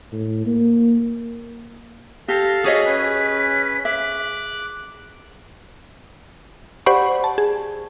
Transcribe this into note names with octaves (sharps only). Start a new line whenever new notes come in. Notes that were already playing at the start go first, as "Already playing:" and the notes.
A2
A#3
G4 A4 F5 A#6
F#4 G#4 C#5 D#5 B6
C#4 B4
E5 D6 F#6
G4 C5 D5 F#5 B5 C#6
A5
G#4